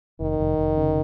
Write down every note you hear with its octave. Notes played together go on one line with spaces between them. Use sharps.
F1 D#3
F1
F1
C#3